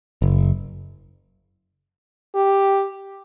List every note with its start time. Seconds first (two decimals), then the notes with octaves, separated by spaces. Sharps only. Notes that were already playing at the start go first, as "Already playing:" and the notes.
0.22 F#1
2.35 G4